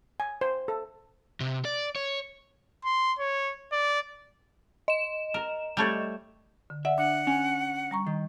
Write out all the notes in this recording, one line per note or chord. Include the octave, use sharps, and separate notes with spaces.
G#5
C5
A4
C3
D5
C#5
C6
C#5
D5
D#5 E7
A#4
G3 A3 C#5
D3
D5 E5 F#5
D4 F#5
C#4 G#5
G3 A#5 C#6
D#3